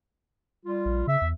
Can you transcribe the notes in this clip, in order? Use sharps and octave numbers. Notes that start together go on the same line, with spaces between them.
G3 F4
A#1
C#3 E5
E2